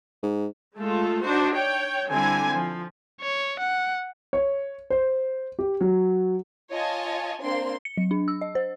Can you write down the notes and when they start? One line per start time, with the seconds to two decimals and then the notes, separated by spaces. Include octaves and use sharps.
0.23 G#2
0.77 G#3 A3 F4 A4
1.23 D4 D#4 F#4 C5
1.54 C#5 G5
2.10 D3 G3 C4 E4 G#5
2.51 F3
3.21 C#5
3.60 F#5
4.33 C#5
4.90 C5
5.59 G4
5.81 F#3
6.71 F4 C#5 D#5 G#5 A5
7.40 A#3 C4 D4 C6
7.85 C#7
7.97 F#3
8.11 D4
8.28 E6
8.41 D#5
8.55 C5